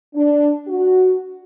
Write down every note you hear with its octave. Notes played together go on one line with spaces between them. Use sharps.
D4
F#4